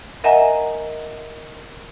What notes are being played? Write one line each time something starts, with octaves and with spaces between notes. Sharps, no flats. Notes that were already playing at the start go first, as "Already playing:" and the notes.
A#4 D#5 E5 F#5 G#5 A#5